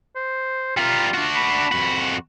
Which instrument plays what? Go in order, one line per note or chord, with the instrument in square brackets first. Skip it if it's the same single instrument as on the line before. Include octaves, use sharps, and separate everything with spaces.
[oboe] C5
[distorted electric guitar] G3 A#4 [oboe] F4
[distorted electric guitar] D4 F#4
[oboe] B5
[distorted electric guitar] F2 F#4